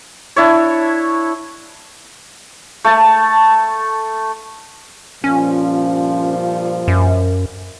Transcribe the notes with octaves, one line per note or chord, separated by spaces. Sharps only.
D4 E4 C#5
A3 A5
G2 A#2 F3 C#4
F#2